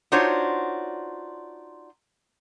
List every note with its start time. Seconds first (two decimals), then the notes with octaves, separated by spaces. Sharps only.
0.12 D4 D#4 F4 F#4 C5 C#5